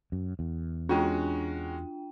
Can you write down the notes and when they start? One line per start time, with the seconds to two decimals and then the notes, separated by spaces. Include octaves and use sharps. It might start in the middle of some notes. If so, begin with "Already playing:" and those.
0.12 F#2
0.39 E2
0.89 G#3 C#4 D4 F4 F#4 G5